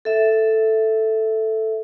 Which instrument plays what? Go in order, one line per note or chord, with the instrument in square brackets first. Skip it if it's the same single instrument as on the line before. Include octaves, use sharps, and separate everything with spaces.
[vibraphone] A4 E5